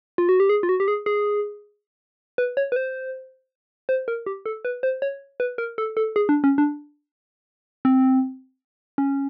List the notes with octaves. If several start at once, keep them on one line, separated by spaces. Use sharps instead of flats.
F4
F#4
G4
G#4
F4
F#4
G4
G#4
G#4
B4
C#5
B4
C5
C5
A#4
G4
A4
B4
C5
C#5
B4
A#4
A4
A4
G#4
D4
C#4
D4
C4
C#4